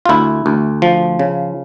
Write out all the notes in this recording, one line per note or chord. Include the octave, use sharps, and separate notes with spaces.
F4
D2 E4
D2
F3
C#3